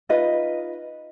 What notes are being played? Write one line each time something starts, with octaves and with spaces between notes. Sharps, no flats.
D#4 F4 B4 D#5